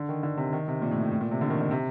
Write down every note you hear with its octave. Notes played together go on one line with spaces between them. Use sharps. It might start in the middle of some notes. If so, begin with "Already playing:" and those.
Already playing: D3
D#3
D3
C3
D#3
C3
A#2
A2
A2
A2
A#2
C3
D3
D#3
D#3
C3